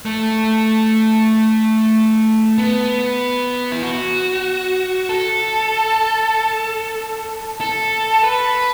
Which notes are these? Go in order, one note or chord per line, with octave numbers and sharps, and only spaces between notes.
A3
B3
E4
F#4
A4
A4
B4